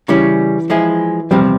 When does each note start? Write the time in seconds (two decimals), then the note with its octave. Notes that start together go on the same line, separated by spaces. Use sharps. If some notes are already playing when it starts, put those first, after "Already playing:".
0.08 C#3 E3 G3 C#4
0.70 F3 G#3 E4 G#4
1.31 E2 C3 F3 G3 C4